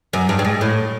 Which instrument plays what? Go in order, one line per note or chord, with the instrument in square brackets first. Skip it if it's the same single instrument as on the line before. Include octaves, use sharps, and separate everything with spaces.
[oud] F#2
G2
G2
G#2
A2